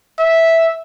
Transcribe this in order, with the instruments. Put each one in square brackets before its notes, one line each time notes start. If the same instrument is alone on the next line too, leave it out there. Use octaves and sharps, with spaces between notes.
[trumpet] E5